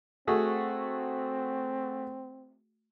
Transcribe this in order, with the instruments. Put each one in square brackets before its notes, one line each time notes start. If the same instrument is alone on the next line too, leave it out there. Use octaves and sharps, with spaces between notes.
[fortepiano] A3 F#4 G#4 [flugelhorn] C4